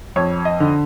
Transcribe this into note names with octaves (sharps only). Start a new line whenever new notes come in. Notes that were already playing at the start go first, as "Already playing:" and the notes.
F2 C#5
D#5
D3